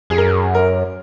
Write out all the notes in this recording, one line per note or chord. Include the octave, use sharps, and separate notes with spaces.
F2 G#4
F#2 A#4
A#4